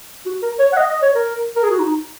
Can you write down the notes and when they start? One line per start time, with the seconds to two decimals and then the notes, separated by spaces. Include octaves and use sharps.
0.26 F#4
0.42 A#4
0.59 C#5
0.73 F#5
0.77 D#5
0.89 D#5
1.03 C#5
1.15 A#4
1.56 A#4
1.63 G#4
1.71 F#4
1.79 D#4